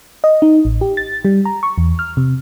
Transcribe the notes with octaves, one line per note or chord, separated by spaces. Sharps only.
D#5
D#4
A1
G4
A6
G3
A#5
C#6
E2
F6
C3